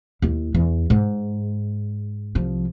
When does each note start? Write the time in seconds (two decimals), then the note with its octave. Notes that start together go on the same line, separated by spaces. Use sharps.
0.22 D#2 E4
0.55 E2
0.90 G#2
2.35 C2 F3